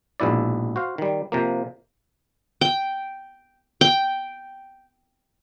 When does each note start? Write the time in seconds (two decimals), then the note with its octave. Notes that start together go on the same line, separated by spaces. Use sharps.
0.20 A#1 G#2 B2 E4 D5
0.76 F#4 C5 F5
0.98 D#3 G3
1.32 C3 F3 A#3
2.61 G5
3.81 G5